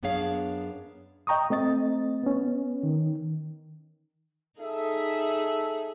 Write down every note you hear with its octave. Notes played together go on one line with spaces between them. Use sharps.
F#2 B3 D4 G#4 C#5 F5
D#5 G5 A#5 C#6 D#6
A3 C4 D#5 A6
B3 C#4
D#3
D#4 G#4 A4 E5